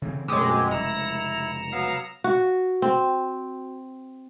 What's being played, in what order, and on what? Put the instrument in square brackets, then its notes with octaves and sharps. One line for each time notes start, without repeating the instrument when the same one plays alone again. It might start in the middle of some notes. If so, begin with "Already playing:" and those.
[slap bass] C#3 E3 C4
[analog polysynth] F#2 G#3 [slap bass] B2 D3 A3 [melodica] C4 G4
[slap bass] F1 C#3 G#3 [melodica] E4 [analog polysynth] A#5 C#7 E7
[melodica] F#3 B3 F5
[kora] F#4
C4